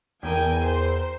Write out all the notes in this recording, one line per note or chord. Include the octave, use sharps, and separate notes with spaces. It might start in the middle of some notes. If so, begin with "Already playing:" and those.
E2 A#4 G5 G#5
A#4 C5